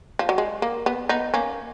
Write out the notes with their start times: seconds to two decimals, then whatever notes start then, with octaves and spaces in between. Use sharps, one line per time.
0.19 F3
0.29 F#3
0.38 G#3
0.62 A#3
0.86 B3
1.09 B3 D#4
1.34 A#3 C#4